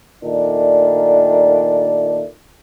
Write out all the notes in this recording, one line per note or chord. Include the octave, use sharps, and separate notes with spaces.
A#2 D#3 A3 D4